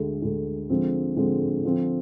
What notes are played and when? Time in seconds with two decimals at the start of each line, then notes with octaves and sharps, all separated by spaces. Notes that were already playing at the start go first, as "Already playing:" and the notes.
Already playing: D2 D3 G#3
0.22 D2 D3 G#3
0.70 D3 F3 G#3 C4
1.16 D3 F3 G#3 C4
1.64 D3 F3 C4